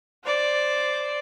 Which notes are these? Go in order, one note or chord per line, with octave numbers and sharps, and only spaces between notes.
C5 D5